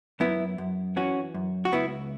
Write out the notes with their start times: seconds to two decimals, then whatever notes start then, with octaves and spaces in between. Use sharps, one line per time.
0.20 F#2 B3 E4
0.58 F#2
0.96 E3 C#4 F#4
1.34 F#2
1.65 F#4
1.73 C#2 B3 E4